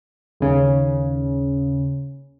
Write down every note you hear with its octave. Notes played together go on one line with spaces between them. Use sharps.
D#2 C#3